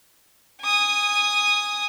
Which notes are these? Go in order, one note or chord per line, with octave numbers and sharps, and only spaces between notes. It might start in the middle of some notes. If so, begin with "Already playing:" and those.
G#5 D#6